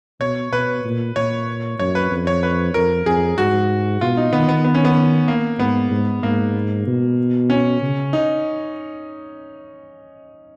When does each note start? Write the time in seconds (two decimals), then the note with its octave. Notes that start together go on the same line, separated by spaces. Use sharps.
0.20 B2 C#5
0.52 B2 B4
0.85 A#2
1.16 A#2 C#5
1.79 F#2 C#5
1.95 B4
2.11 F2
2.27 C#5
2.43 B4
2.74 F2 A#4
3.06 F2 G#4
3.38 G#2 F#4
4.01 B2 F4
4.17 D#4
4.33 D#3 B3
4.49 B3
4.65 B3
4.74 C#4
4.85 B3
5.28 A#3
5.59 G#2 B3
5.91 G#2
6.23 G#2 A#3
6.87 B2
7.50 C#4
7.81 C#3
8.13 D#4